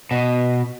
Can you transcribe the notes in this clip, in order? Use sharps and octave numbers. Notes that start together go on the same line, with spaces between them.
B2